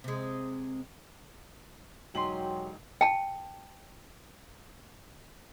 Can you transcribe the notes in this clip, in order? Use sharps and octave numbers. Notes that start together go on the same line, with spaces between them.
C3 G#3
E1 F#3 D#4 G4 G5 G#5 C6 F#7
G5 A5